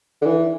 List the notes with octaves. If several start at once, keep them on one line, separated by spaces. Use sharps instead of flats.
D3
E3